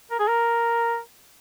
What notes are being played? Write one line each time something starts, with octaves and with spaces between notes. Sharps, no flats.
A#4
G#4
A#4